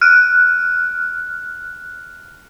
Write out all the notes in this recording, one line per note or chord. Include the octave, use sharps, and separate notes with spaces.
F6 F#6